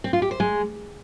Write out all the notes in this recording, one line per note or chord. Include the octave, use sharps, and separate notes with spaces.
C4
F4
G4
C5
G#3